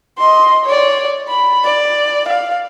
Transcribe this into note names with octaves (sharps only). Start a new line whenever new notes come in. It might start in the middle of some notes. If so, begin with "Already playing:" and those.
D#5 C6
C#5 D5
B5
D5
F5